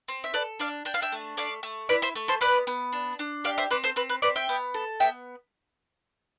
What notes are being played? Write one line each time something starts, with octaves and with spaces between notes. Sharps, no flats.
C4
E5
A4 B4 D5
D4 D5 F5
D4 G5
F5
E5 G5
A3
A3 D5 F5
A3
E4 B4 D5
C5 E5
A3
A4 C5
B3 B4 D5
B3
D4
D4
G4 D5 F5
C5 E5
C4 B4 D5
A4 C5
C4 B4
B4
C4 B4 D5
E5 G5
B3
A4
B3 E5 G5